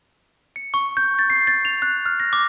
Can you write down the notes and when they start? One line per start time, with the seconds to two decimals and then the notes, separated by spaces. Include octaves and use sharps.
0.56 C#7
0.74 C#6
0.97 G6
1.19 A6
1.30 C7
1.47 A6
1.65 F7
1.82 F#6
2.06 F6
2.20 A#6
2.33 D6